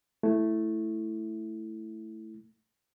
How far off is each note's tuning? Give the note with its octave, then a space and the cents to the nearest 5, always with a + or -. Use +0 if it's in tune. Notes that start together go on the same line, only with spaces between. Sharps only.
A3 +0 E4 +0